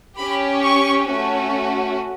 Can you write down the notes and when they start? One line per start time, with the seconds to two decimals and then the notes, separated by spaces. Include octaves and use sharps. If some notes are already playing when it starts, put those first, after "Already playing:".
0.17 C#4 G4 B5
0.62 C#6
1.07 A3 C#4 F#4